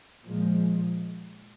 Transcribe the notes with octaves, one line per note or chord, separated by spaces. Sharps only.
A#2 F3 G#3